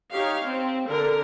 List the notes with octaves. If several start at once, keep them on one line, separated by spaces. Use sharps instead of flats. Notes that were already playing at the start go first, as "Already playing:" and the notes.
D#4 G4 C#5 F5
C4
D3 A#4